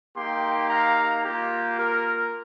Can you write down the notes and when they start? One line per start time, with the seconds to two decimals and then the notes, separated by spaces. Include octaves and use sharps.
0.17 A#3 D#4 G4 G5 C6
0.70 F5 A#5
1.24 A#3 F4 G4
1.78 A#4